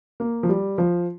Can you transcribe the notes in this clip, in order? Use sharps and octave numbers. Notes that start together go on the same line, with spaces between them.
A#3
F3
G3
F3